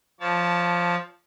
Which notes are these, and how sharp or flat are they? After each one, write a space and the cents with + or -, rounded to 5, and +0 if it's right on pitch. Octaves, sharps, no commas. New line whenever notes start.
F3 +0 C#5 +30 A5 +0